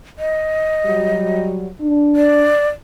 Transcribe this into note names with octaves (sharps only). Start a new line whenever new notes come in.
D#5
F#3 G3
D4
D5